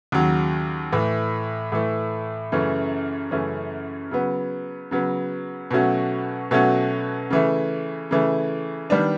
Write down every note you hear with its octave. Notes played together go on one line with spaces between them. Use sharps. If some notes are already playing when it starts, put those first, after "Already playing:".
D#2 C#3 F#3
A2 E3 A3
A2 E3 A3
F#2 C#3 E3 A3 C#4
F#2 C#3 E3 A3 C#4
C#3 F#3 B3
C#3 F#3 B3
B2 F#3 A3 C#4 F#4
B2 F#3 A3 C#4 F#4
C#3 E3 A3
C#3 E3 A3
D#3 G3 B3 D4